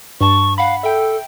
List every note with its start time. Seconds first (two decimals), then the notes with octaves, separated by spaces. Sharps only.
0.21 G2 A5 C#6
0.58 F5 F#5 B5
0.83 A4 E5 G5